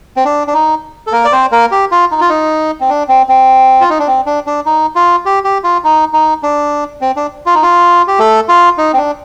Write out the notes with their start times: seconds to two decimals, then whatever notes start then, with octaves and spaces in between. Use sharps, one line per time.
0.17 C4
0.25 D4
0.47 D4
0.54 D#4
1.07 A4
1.12 A#3 A#4
1.25 D5
1.32 C4 C5
1.52 A#3 A#4
1.71 G4
1.91 F4
2.11 D#4
2.21 F4
2.29 D#4
2.81 C4
2.90 D4
3.09 C4
3.29 C4
3.81 F4
3.90 D#4
3.99 D4
4.07 C4
4.26 D4
4.47 D4
4.66 D#4
4.95 F4
5.25 G4
5.44 G4
5.64 F4
5.84 D#4
6.13 D#4
6.43 D4
7.01 C4
7.16 D4
7.46 F4
7.55 D#4
7.62 F4
8.07 G4
8.19 A3 A4
8.49 F4
8.78 D#4
8.93 C4
8.98 D4